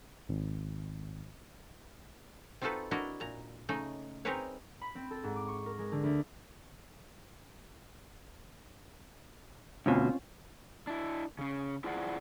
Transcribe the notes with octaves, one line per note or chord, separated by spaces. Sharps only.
G#1
C4 D#4 F4 F#4 A4 B4
D4 E4 F#4 A#4 D#5
A#2 A#5
C#3 A3 D#4
C4 D#4 G#4 A#4 B4 C#5
B5
C4
A4
G#2
D6
C#6
A#4
G#3
D3
D2
D2 B2 C4 C#4 F4
D4 E4
C#3 C#4
E4 F4 G#4 C5 D5 F#5